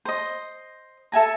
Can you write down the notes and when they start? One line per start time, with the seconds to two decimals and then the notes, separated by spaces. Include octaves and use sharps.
0.05 C5 D#5
1.12 A4 E5 G#5 A#5